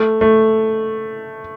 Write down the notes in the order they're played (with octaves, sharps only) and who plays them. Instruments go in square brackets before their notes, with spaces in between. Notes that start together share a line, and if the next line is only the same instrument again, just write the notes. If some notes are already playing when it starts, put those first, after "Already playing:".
Already playing: [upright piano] A3
A3